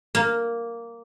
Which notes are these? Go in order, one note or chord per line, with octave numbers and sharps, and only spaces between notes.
A#3